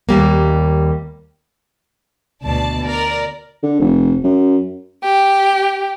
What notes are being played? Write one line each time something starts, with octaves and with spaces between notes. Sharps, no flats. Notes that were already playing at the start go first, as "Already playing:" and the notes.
D#2 G3 A#3
D2 B2 D5 A5
A#4 D5
D3
F1
F#2
G4